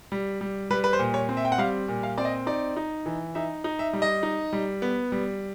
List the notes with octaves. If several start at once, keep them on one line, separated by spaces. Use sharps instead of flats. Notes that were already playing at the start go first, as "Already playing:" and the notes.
G3
G3
G3 B4
B4
C5
A#2
C#5
C4
E5
G5
F#5
G3 F5
A#2
F5
C4 D5
D#5
D#4 D5
D#4
E3
D#4 E5
D#4
E5
G3
D#5
D#4
G3
B3
G3